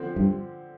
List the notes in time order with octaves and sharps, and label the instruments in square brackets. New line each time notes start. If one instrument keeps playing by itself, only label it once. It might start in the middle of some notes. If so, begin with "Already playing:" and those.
Already playing: [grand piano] D3 F3 C4
[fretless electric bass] G2